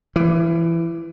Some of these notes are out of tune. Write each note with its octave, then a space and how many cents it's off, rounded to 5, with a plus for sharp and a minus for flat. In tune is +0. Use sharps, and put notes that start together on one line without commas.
E3 +20